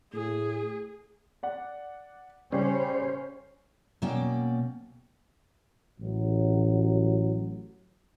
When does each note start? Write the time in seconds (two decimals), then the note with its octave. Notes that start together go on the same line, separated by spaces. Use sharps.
0.13 A2 G#4
1.43 D5 F#5
2.52 C#3 G3 C#4 C5
4.02 B2 F#3 A#3 C#4 D5 G5
6.00 A1 F#3